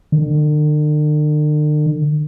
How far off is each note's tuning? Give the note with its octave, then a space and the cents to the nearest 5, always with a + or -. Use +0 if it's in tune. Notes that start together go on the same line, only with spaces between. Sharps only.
D3 +45